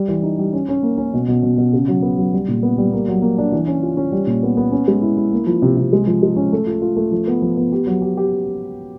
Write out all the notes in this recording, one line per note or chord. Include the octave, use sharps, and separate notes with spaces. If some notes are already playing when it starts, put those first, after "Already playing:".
Already playing: G3
E3
D#4
G3
C#4
C#4
A#3
C#4
B2
B2
B2
B2
C#3
F#3
B3
F#3
G3
A#2
B3
G3
A#3
F#3
A#3
D4
E3
C#4
F4
C#4
G3
A#2
B3
B3
C#4
G#3
E4
E4
A#3
F3
C3
C3
G#3
F3
G#3
C#4
A3
F4
F4
A3
F3
B3
F3
B3
G4
F#3
G4
G4